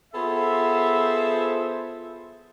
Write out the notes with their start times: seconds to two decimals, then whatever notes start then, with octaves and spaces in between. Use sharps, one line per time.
0.14 B3 F4 G#4 A4 C5 E5